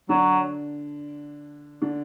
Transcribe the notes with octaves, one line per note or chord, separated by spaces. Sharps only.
D3 F#3 D4
D3 D4